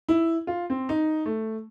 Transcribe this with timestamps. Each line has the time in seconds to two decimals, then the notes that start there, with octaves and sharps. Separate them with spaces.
0.09 E4
0.47 F4
0.70 C4
0.89 D#4
1.26 A3